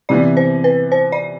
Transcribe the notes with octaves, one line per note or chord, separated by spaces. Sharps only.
C3 E3 B3 D5
C5
B4
C5
D5